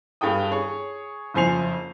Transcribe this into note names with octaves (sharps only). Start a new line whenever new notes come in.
G2 G#4 A4 G5 D#6
G#4 C#5
F#1 F2 C5 G#5 C7 F7